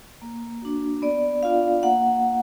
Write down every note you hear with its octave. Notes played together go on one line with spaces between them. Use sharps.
A#3
D4 F#4
B3 D5
D4 F4 F5
A#3 F#5